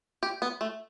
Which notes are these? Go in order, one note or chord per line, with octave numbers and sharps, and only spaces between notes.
G4
B3
A3